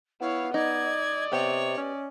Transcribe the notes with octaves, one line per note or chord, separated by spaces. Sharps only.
B3 E4 C#5 F5
D#4 D5 D#5 G#6
C3 B3 G4 C#5
C#4